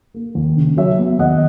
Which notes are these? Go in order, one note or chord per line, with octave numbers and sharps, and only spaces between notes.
A#3
D#2
C#3
F#3 C#5 E5
B3
D#2 D#5 F#5